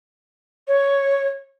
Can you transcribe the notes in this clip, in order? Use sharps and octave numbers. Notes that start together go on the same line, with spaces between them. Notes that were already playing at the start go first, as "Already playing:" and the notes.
C#5